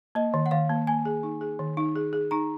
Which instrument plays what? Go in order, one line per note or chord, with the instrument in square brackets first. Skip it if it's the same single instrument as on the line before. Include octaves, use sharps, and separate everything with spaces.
[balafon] A#3 [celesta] D#5
[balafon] D#3
[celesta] F#5
[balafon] D#3 [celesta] F5
[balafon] A#3
[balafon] A#3 [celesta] G#5
[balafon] G#4
D#4
G#4
D#3
D#4
G#4
G#4
[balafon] D#4 [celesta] A#5